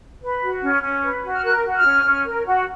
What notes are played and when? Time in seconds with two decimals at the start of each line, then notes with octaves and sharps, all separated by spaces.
0.22 B4
0.42 F#4
0.62 C#4
0.83 C#4
1.03 B4
1.23 F#4
1.33 F6
1.44 A#4 F#6
1.64 F#4
1.74 F6
1.84 C#4
2.04 C#4
2.25 A#4
2.46 F#4